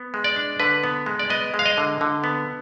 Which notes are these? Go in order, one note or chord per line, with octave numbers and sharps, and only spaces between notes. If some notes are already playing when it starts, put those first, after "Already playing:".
Already playing: B3
G#3
D5
D4
D3 B4
B3
G#3
D5
B3 D#5
G#3
F5
D#5
D3
D3
B3